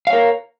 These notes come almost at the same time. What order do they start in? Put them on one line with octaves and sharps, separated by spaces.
F5 C#5 A#4